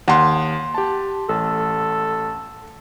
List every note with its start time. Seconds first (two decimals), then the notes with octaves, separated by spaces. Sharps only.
0.08 D#2 F#5 C6
0.74 G4 A5
1.29 A1 A4